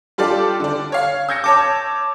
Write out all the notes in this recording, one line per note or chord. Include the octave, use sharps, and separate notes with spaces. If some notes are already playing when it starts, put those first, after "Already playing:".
G3 D4 F4 G4 A4 D5
D3 D4
C#5 F5
E6 G6 G#6 A#6 C#7
C#5 A5 D6